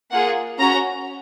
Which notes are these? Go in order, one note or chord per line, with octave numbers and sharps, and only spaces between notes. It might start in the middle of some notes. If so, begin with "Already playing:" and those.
A#3 F4 G#4 F#5
C#4 F#4 A#5